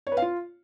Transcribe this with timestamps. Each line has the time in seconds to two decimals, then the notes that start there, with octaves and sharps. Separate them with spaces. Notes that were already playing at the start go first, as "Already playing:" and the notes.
0.07 C#5
0.12 B4
0.17 F5
0.22 F4